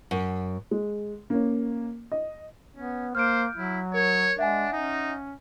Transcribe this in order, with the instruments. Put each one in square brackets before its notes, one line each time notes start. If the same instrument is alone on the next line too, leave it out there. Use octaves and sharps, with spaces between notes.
[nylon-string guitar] F#2
[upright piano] G#3
A#3 C#4
D#5
[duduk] B3 [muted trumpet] C#4
[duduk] A#3 [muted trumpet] C5 [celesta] F6 G6 D7
[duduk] F#3 [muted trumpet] E4
[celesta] A#4 [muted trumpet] C#5
[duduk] G#3 [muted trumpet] D4 [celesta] E5 F#5 G#5
[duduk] C#4 [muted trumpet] D#4